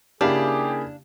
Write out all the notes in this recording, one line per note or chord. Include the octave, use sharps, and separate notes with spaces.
C#3 A#3 D4 E4 G4 G#4 F5